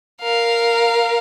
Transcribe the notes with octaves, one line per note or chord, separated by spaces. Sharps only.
A#4 F5